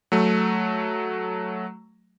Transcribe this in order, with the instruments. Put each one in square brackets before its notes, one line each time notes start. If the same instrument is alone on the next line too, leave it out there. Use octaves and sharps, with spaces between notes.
[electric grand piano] F#3 A3